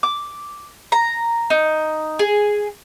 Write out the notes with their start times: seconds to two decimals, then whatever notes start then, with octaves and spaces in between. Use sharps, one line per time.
0.03 D6
0.92 A#5
1.50 D#4
2.19 G#4